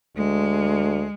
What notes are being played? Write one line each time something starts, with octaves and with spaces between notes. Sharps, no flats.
D2 G#3